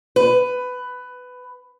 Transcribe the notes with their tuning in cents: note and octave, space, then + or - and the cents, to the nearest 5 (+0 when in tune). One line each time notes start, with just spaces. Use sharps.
B4 +15